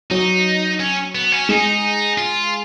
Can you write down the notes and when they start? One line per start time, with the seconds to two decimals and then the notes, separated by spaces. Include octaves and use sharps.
0.11 F#3 D#4
0.80 C#4
1.15 B3
1.32 C#4
1.49 G#3 D#4
2.18 F4